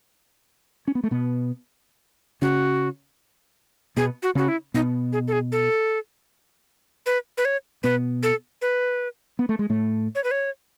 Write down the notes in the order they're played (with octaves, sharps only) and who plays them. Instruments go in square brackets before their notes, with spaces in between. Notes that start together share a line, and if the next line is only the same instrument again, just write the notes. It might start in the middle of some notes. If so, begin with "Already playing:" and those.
[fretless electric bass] C#4
B3
A3
B2 B3
[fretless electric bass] C#3 C#4 [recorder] F#4
[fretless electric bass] B2 B3 [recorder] G#4
[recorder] F#4
[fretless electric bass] C#3 C#4 [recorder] F#4
[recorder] E4
[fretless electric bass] B2 B3 [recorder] D#4
[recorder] G#4
A4
G#4
A4
B4
B4
C#5
[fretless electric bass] B2 B3 [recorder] B4
[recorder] A4
B4
[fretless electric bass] B3
A3
G#3
A2 A3
[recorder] C#5
B4
C#5